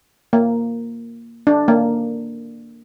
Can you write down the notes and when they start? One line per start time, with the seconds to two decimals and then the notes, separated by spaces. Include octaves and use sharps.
0.33 A#3
1.47 D4
1.68 A#3